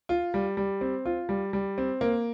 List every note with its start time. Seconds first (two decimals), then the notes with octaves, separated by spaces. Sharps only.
0.09 F4
0.34 G3
0.57 G3
0.81 C4
1.06 F4
1.29 G3
1.53 G3
1.78 C4
2.01 A#3